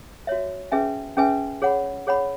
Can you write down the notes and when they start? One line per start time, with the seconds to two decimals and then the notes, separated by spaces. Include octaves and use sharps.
0.27 F#4 C#5 E5
0.72 C#4 G#4 B4 E5 G#5
1.17 C#4 G#4 B4 E5 G#5
1.62 G#4 C#5 F#5 B5
2.07 G#4 C#5 F#5 B5